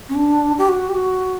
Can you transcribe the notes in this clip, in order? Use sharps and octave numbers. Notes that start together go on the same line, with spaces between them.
C#4
D4
G4
F#4
G4
F#4